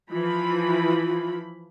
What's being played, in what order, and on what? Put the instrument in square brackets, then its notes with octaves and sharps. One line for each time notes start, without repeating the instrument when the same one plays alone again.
[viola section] E3 F3 B5 [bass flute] F4